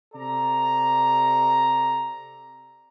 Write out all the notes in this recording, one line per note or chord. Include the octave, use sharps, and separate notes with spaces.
C3 A4 D5 A#5